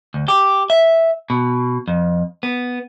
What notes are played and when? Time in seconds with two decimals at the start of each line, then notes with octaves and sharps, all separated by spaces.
0.14 D2
0.28 G4
0.70 E5
1.30 B2
1.88 F2
2.43 B3